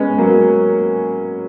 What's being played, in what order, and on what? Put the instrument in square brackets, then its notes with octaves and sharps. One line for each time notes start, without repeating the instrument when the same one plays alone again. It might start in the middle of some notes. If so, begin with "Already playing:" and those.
Already playing: [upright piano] G#3 B3 C#4
F#3 A#3